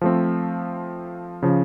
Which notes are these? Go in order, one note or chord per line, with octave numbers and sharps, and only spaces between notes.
F3 A3 C4
C#3 F3